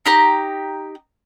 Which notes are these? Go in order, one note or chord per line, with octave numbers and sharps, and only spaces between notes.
D#4 G4 A#5